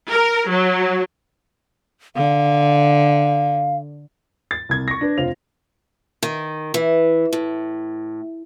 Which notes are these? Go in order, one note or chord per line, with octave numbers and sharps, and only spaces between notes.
A#4
F#3
D3 F5
A6
C2 G#6
C#6 A#6
D4 B4
F1 F4 C5 F7
D#3
E3
A2